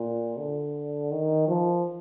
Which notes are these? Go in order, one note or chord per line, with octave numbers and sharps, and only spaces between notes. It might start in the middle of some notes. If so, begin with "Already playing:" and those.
Already playing: A#2
D3
D#3
F3